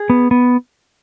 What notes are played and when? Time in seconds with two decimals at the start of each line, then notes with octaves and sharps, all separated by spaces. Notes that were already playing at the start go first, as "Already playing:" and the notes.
Already playing: G#4
0.10 B3
0.31 B3